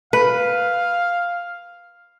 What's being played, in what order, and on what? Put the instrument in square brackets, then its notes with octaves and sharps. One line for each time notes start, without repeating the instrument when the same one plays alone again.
[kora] B4 [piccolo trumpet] F5